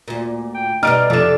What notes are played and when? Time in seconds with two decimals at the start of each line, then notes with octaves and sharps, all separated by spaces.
0.08 D2 A#2
0.54 G5
0.83 B2 G3 D#4 D5 F6 D7
1.10 F2 C3 D4 A4 E7